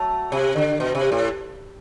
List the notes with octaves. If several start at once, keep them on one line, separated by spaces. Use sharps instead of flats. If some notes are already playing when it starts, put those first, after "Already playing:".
Already playing: F#3 A3
C3
D3
B2
C3
A2